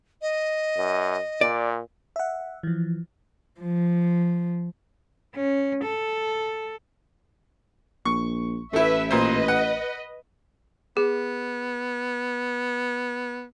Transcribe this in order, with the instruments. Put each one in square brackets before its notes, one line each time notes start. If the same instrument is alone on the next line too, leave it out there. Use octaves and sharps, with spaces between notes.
[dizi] D#5
[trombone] F#2
[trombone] A#2 [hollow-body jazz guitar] D5
[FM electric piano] E5 F#5
E3 F3
[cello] F3
C#4
A4
[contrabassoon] A#1 [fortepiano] C#6
[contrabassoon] A1 [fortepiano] A3 E4 [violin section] B4 E5
[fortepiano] A#2 C5 [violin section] B4 D#5
[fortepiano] F#5
[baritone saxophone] B3 [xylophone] G#4